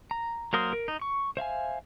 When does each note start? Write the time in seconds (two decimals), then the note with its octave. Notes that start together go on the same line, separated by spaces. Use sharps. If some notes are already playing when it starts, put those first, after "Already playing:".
0.11 A#5
0.53 F#3 A#3 A#4 C5 D#6
0.73 A#4
0.88 D#4
1.01 C#6
1.37 C5 E5 F5 G#5